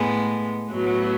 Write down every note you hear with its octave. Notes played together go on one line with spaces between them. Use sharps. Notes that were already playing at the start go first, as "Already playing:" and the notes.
Already playing: A2 G#3 B3
A2 F#3 B3